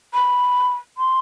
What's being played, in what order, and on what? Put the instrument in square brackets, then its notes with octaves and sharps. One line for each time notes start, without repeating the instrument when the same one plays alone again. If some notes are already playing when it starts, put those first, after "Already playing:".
[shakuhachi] B5
C6